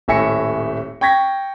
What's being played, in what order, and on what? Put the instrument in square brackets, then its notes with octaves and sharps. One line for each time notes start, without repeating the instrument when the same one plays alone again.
[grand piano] D#1 A2 E5 G#5 A#6 C#7
G5 C#6 G#6 A#6 B6